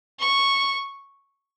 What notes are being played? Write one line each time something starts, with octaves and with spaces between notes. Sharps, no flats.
C#6